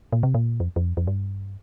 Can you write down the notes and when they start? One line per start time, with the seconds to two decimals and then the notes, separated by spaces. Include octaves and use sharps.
0.12 A#2
0.23 C3
0.34 A#2
0.60 F2
0.76 F2
0.97 F2
1.07 G2